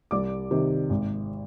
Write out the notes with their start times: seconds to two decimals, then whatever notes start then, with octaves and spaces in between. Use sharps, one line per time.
0.11 C2 D5 D6
0.51 C3 D#3
0.90 G#1